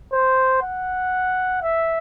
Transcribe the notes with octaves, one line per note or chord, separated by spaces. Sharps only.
C5
F#5
E5